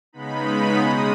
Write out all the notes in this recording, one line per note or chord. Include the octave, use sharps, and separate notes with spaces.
C#3 G#3 B3 D#4 B5
B2 G#3 C#4 D#6